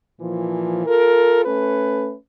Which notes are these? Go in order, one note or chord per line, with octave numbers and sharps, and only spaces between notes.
A#2 E3 F3
F4 A4 A#4
A3 C#4 A4 B4